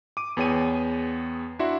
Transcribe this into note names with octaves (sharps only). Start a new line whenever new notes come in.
D6 D#7
E2 B3 G#4 C#5 G5 D#7
D4 E4 F#4 E5 F#5 C6